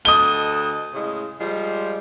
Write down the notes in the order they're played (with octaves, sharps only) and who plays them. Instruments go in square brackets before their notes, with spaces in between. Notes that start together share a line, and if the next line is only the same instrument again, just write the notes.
[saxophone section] D2 A4 D#5 [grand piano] D#6 G7
[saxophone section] A2 C#3 G#3
F3 G3 G#3